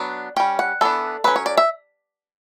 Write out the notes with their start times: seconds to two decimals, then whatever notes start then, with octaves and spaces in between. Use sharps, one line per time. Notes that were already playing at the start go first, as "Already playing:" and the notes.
Already playing: F#3 B3 D4
0.36 G3 C#4 G5
0.59 F#5
0.81 E3 B3 D4 A4
1.24 F#3 C#4 B4
1.36 C#5
1.46 D5
1.57 E5